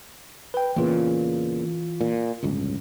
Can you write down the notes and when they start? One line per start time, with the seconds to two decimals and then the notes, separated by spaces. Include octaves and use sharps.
0.54 B4 G5
0.76 E2 A#2 C#3 E3 F4
2.01 A#2
2.43 D1 G1 C#2